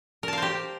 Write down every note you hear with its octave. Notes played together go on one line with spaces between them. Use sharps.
G4 A#4 C5 F5 A5